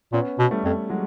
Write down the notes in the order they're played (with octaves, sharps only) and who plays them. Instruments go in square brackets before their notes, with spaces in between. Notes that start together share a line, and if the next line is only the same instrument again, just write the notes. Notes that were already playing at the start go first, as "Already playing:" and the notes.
[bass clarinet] A#2 [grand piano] B3 C#4
[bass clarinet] B2
[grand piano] G3 A3
[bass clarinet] F2
[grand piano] F#3 G#3